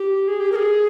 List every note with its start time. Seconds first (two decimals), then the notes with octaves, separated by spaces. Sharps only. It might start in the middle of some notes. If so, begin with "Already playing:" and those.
Already playing: G4
0.28 G#4
0.40 G4
0.52 A#4
0.56 G#4